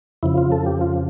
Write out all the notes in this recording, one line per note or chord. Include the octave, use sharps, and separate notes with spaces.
F2 C#3 F3 E4
F4
A4
G4
F4